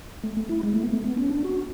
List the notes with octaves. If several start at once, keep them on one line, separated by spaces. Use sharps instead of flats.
A3
A3
E4
G#3
A3
B3
A3
B3
C#4
D4
F#4